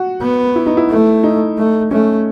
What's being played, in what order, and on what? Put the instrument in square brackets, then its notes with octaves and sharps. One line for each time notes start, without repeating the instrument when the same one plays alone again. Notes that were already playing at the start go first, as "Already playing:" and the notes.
Already playing: [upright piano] F#4
[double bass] B3
[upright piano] E4
D#4
E4
[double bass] A3
[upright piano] D#4
[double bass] A3
[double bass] A3 [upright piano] C#4